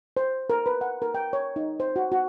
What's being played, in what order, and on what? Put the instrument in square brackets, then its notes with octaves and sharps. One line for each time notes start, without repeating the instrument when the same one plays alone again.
[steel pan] C5
A#4
B4
F#5
A#4
G5
C#5
D#4
C5
F#4
F#4